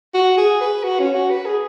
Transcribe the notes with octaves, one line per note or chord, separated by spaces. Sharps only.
F#4
G#4
B4
F#4
C#4
F#4
B4
G#4